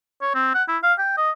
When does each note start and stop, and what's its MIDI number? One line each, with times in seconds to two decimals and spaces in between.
0.22 0.33 73
0.34 0.51 60
0.54 0.63 78
0.68 0.78 64
0.83 0.94 77
0.99 1.17 79
1.17 1.31 75